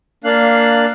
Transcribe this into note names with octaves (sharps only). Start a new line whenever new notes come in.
A#3 D4 F5 F#6